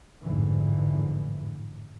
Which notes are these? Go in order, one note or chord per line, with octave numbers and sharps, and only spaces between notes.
A1 F2 G#2 D3 E3